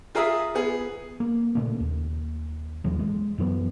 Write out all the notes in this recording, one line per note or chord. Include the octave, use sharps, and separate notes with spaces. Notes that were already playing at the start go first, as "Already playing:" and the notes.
F4 G#4 A#4 E5 D#6
B3 G#4
A#3
A#2 C#3 A3 A#3
D#2
A1 D#2 E3 F#3
G#3
F#2 E3 F#3 B3